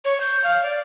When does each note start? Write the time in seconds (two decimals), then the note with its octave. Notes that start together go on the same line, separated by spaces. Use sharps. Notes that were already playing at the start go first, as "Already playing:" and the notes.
0.05 C#5
0.20 G6
0.44 F5
0.63 D5